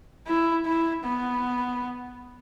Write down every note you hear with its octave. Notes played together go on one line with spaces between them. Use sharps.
E4
E4
B3